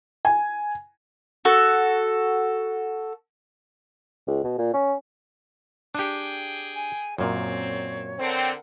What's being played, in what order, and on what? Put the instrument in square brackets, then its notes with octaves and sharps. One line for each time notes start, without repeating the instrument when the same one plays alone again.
[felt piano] G#5
[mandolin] F#4 A4
[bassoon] C#2
B2
A#2
C#4
[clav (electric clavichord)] D4 G4 [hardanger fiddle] G#4 G5
[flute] G#5
[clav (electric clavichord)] F#2 A#2 [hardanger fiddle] C4 [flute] C#5
[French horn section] D3 C4 [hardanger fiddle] A#4 F#5